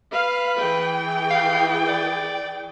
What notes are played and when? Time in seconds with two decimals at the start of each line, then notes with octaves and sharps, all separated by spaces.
0.13 B4 F5
0.59 E3 G#4 G5
1.30 F5
1.89 D5